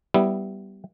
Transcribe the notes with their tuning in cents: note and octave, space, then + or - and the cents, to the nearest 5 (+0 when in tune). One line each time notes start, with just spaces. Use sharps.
G3 -10 B3 +0 E4 +0